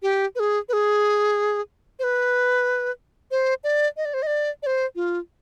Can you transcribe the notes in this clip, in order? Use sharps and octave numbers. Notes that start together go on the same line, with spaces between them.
G4
B4
G#4
B4
G#4
C5
B4
C5
D5
D#5
D5
C5
D#5
D5
D5
C5
F4